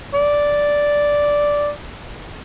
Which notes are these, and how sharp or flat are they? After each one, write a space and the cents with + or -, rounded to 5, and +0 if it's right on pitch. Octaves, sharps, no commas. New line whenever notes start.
D5 -5